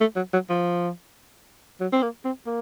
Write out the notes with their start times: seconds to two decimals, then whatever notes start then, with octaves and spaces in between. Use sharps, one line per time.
0.01 A3
0.16 F#3
0.33 F#3
0.49 F3
1.80 F#3
1.93 C4
2.02 A#3
2.25 C4
2.46 A#3